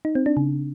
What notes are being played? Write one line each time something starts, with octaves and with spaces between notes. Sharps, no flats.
D#4
C4
D4
C#3